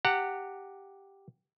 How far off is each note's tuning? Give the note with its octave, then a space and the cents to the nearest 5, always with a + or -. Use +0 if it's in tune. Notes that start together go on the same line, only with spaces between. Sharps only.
G4 +0 F#5 +0 A#5 -35